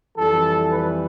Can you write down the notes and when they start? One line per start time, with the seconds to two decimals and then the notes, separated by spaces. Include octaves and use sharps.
0.17 F2 E3 G3 A4
0.72 B4